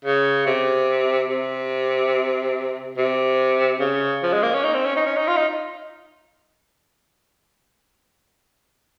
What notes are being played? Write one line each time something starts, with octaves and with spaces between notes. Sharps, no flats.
C#3
C3
C3
C3
C#3
F3
G#3
A#3
C#4
D#4
C4
C#4
D#4
C#4
D#4
F4
D#4